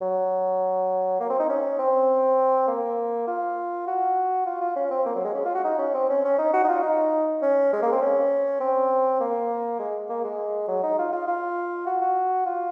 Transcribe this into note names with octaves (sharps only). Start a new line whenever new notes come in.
F#3
A#3
C4
D#4
C#4
C4
A#3
F4
F#4
F4
F4
C#4
C4
A#3
F#3
G#3
C#4
F4
F#4
D#4
C#4
C4
C#4
C#4
D#4
F#4
D#4
F4
D#4
C#4
G#3
A#3
C4
C#4
C4
A#3
G#3
A#3
G#3
F#3
D#4
F4
F4
F4
F#4
F#4
F4